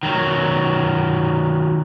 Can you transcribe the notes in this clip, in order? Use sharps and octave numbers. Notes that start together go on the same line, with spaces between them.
D#3 F#3